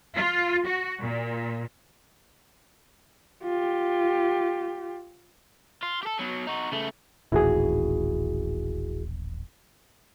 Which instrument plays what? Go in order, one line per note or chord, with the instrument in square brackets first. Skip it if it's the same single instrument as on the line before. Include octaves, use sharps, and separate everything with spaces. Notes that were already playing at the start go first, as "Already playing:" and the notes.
[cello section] F4
F#4
A#2
[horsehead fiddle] F4 G4
[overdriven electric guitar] F4
G4 A4
B2 F#3
D#4 F#4
C#3 A3
[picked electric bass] D#1 A1 [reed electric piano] E4 F#4 G#4